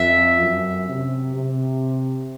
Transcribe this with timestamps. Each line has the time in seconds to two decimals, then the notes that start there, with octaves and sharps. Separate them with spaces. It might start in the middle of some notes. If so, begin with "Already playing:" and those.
Already playing: F2 E5
0.40 F#2
0.89 C3
1.36 C3